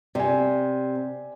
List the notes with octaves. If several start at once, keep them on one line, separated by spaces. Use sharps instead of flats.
C3 D5 G#5